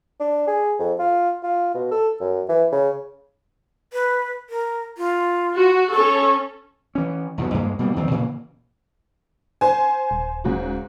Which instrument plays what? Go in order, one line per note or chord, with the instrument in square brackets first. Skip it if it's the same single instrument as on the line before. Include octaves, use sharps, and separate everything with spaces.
[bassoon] D4
G#4
F2
F4
F4
B2
A4
F#2
E3
C#3
[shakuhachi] B4
A#4
F4
[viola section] F#4
[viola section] C#4 A4 [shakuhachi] C#6
[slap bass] E3 C#4
B1 E2 G2 B2
D2 G2 G#3 A#3
B2 G3 A#3
E2 D#3 F3 C4
A#2 C#3 E3 A#3
[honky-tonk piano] C5 G#5
[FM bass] D#1
[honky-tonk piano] G#2 C#3 F#4